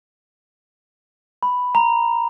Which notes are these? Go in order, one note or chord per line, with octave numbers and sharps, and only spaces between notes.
B5
A#5